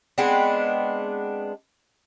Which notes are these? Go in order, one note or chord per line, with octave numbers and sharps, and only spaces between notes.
G#3 B3 C4 D4